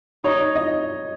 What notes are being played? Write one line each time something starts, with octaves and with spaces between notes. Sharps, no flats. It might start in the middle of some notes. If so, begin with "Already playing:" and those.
D#4 C#5
D#5